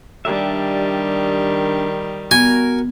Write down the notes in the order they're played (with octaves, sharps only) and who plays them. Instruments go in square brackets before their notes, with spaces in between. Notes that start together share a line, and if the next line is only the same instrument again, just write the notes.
[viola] D#3 G3 [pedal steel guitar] D4 G4 E5
[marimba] B3 [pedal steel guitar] F#4 A#4 [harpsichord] G#5